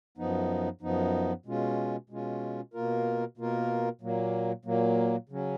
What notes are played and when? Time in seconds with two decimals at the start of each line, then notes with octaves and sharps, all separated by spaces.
0.18 F#2 F3 B3 D#4
0.81 F#2 F3 B3 D#4
1.46 B2 G#3 C#4 F4
2.10 B2 G#3 C#4 F4
2.74 B2 A#3 F4 A#4
3.38 B2 A#3 F4 A#4
4.01 A#2 F#3 A#3
4.65 A#2 F#3 A#3
5.29 C#3 F#3 C#4